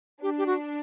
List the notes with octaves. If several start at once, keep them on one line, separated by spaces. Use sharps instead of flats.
D4 G4
G4
F#4